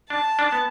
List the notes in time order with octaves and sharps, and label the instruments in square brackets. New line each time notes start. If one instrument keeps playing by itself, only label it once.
[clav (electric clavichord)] D4 [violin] A5
[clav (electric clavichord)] D4
B3